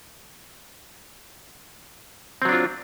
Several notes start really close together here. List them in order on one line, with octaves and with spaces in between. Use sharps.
C4 F#3 D4 F4